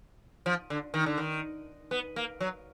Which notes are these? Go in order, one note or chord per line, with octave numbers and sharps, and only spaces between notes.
F3
D3
D#3
D3
D#3
B3
A#3
F#3